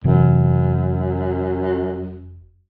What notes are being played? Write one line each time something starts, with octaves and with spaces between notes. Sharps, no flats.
F1 F#2 C3 E3